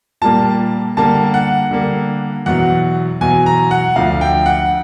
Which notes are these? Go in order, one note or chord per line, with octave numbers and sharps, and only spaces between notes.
A#2 G3 A#3 A5
D3 G3 A#3 A5
F#5
D3 G3 A#3
E2 B2 F#3 F#5
E2 B2 F#3 G#5
A#5
F#5
D2 D3 F3 F5
G5
F#5